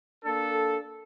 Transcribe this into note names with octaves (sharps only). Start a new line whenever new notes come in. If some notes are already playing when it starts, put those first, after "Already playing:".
A#3 D4 A4